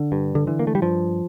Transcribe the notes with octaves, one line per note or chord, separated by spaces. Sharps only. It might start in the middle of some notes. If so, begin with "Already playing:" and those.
Already playing: D3
G2
D3
D3 E3
A#3
A3
G3
G2 F3